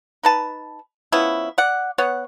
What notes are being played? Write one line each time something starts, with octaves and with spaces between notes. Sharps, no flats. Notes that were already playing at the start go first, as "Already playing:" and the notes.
D#4 B4 A5
F3 B3 C#4 E4
D5 F#5
B3 C#5 F#5